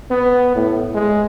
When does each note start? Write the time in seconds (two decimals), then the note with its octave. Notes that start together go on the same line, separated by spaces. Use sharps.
0.10 B3
0.55 A2
0.94 G#3